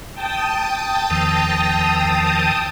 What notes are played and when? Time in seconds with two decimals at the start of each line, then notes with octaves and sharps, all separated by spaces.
0.15 G5 A5 D#6
1.10 E2 D#3 F3